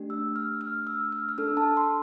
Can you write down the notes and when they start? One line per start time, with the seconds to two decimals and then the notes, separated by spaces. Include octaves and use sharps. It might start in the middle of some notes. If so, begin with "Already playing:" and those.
Already playing: A3 D4 G4
0.10 E6
0.36 F6
0.61 F6
0.87 E6
1.12 F6
1.29 F6
1.38 D4 A4 E6
1.57 A5
1.77 C6